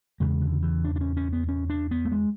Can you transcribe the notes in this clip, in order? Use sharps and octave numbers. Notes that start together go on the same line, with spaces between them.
E2 C#3 G#3
D3
E3
D4
D4
C#4
C#4
B3
C#4
D4
B3
A3
G#3